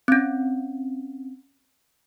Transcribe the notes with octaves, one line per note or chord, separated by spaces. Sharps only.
C4 C#4